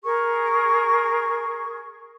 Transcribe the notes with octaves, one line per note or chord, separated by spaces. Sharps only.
G#4 A#4 C#6